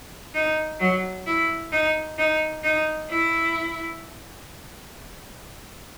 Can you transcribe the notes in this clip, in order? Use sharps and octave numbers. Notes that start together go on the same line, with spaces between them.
D#4
F#3
E4
D#4
D#4
D#4
E4